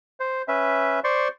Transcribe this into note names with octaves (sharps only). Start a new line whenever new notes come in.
C5
C#4 B4 E5
C5 D5 C6 C#6